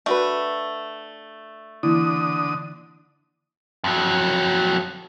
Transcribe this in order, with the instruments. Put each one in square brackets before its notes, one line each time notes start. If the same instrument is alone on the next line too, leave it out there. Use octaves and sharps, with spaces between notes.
[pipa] A3 [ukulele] D4 F#4 B4
[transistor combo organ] D3 D#6 [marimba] E3 A#3 E4
[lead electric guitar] F2 F#3